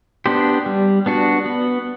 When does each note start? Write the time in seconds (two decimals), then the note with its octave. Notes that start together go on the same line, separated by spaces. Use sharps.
0.26 B3 D4 G4 C5
0.66 G3
1.06 B3 D4 F#4
1.46 B3